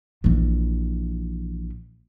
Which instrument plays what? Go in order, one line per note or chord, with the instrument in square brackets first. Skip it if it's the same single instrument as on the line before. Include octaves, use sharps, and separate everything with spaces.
[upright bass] A#1 E3